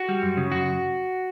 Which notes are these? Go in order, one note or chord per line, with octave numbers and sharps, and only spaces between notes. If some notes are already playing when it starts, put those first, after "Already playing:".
Already playing: F#4
G3
F#2
C#3
F#2 F#4